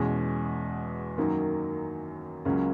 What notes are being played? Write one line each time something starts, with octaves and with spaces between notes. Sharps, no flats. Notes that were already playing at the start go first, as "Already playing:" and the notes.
Already playing: E2 B2 G#3 C#4
F#2 D#3 F#3 A#3 D#4
C#2 C#3 F#3 A#3 C#4